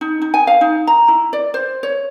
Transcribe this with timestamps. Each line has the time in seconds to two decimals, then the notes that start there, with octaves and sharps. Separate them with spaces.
0.01 D#4
0.22 D#4
0.34 G#5
0.47 F5
0.61 D#4
0.87 A#5
1.08 E4
1.33 D5
1.54 C5
1.83 C#5